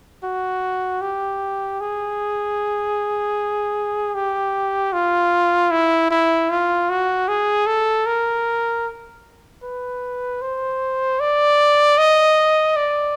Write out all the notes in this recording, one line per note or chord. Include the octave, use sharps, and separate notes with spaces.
F#4
G4
G#4
G4
F4
E4
E4
F4
F#4
G#4
A4
A#4
B4
C5
D5
D#5
D5